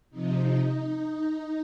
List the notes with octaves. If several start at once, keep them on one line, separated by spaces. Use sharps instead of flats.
C3 F3 D#4